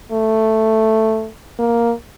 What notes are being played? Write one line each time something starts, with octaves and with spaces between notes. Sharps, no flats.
A3
A#3